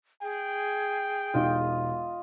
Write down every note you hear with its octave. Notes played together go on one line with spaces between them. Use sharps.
G#4 G5
E1 D#4 F4 G4 D#5